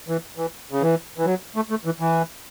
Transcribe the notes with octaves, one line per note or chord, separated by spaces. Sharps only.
E3
E3
C#3
E3
E3
F#3
A3
A3
E3
E3